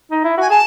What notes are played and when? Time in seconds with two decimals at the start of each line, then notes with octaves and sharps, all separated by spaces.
0.11 D#4
0.24 E4
0.38 F#4 G#5
0.50 G#4 A5